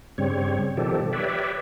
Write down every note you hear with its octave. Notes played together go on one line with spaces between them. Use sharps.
G2 C#3 G3 C4 C#5
B2 D#3 F3 G3 G4 A4
G4 B4 C#5 D5 E5